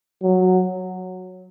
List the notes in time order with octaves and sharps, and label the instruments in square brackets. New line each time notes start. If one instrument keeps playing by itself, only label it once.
[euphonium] F#3